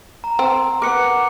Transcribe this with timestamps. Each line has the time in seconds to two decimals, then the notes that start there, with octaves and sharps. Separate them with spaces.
0.24 A#5
0.39 C4
0.82 A#4 B4 F#5 D6 C#7